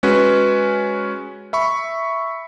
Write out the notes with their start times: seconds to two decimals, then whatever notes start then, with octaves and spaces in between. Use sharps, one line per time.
0.03 G#3 C#4 F#4 B4
1.53 E5 B5 C#6